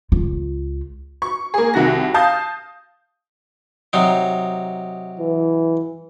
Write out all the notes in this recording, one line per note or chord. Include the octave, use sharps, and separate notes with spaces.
C#2 F4
C#6
A#3 G#4
C2 D#3 F#4 A#6
F5 A5 D#6 G6
C3 F#3 D#4
E3